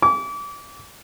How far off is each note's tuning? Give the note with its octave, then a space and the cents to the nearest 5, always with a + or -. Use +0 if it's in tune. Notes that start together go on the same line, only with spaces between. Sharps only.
D6 -30